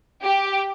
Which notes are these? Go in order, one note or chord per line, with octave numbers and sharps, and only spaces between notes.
G4